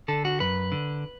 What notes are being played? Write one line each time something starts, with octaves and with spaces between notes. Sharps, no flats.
D3 A4
F#4
F#2 B4
D3